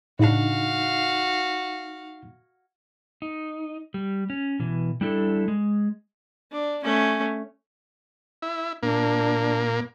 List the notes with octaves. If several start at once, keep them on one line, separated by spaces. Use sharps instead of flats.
A2 C#3 D4 D#4 F#4 F5
D#4
G3
C#4
B2 E3
G3 D4 E4 A4
G#3
D4
A3 C#4
E4
A#2 A#3 D4